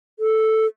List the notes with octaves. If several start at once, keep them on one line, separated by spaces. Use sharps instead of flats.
A4